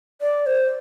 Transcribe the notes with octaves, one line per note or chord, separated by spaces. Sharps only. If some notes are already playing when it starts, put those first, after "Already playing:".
D5
C5